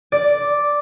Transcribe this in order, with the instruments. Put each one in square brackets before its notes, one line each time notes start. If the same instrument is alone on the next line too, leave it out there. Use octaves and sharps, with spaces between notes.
[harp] D5